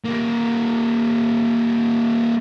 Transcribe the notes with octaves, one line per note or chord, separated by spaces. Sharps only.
G3 A#3